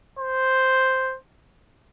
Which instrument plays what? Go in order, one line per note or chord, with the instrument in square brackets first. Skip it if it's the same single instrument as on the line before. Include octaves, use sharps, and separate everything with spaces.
[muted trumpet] C5